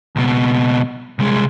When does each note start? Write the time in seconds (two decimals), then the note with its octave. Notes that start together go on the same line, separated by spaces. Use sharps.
0.16 C#2 B2
1.19 C2 G#3